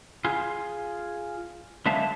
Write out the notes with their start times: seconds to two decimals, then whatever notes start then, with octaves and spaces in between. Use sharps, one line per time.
0.25 F4 G#4
1.86 D3 F#3 G#3 E5 F5 A5